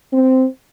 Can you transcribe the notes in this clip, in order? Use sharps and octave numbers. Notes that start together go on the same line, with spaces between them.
C4